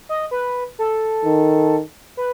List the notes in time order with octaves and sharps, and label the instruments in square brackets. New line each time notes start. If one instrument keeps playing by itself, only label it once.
[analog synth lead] D#5
B4
A4
[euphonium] D#3
[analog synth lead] B4